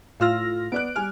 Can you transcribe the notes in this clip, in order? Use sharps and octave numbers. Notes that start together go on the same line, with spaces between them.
A2 F4 F5 E6 F6 A#6
B3 D5 F#6 D7
G3 G#5 F6